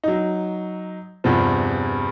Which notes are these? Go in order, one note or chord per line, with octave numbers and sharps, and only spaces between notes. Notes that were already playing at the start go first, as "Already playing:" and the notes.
F#3 D#4
E2 G2 C3 F3